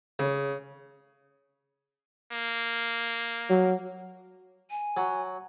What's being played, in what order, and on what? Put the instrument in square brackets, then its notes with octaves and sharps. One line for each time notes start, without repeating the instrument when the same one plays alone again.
[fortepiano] C#3
[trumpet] A#3
[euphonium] F#3
[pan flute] G#5
[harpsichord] F#3